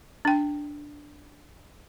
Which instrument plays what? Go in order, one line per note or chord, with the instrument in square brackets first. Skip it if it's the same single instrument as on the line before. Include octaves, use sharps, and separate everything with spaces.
[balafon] D4 G5